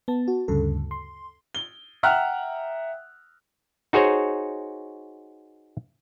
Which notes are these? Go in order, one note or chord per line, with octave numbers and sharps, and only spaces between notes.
B3 A5
F#4
D2 G2 C#3 A4
C6
G7
E5 F#5 G5 A#5 F6 F#6
D#4 F#4 G#4 C5 C#5